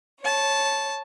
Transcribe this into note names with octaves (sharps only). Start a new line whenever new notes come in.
C#5 A5